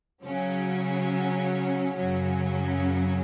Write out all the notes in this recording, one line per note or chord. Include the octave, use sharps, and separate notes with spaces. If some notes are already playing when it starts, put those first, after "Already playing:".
C#3 F#3 C#4
F#2 C#3 F#3 C#4